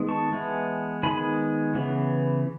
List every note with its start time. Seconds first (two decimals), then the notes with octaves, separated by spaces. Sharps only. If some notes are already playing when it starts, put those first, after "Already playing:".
Already playing: D#3 G#3 B3
0.09 A5 C#6
0.32 E3 G#3 B3
1.03 D#3 G#3 B3 G#5 B5
1.75 C#3 E3 B3